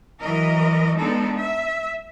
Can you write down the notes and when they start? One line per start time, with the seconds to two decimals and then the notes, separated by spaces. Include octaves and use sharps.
0.20 E3 F#3 A#4 D#5
0.96 G#3 B3 D4 D#4 A4
1.34 E5